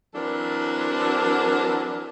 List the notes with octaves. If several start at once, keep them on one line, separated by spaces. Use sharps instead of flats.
E3 F#3 C4 D4 A4 A#4